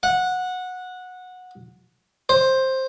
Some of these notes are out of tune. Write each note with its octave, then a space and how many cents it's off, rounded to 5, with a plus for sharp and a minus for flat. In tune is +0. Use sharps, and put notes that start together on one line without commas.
F#5 -15
C5 +10